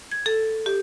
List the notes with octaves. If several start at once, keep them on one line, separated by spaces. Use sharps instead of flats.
G#6
A4
G4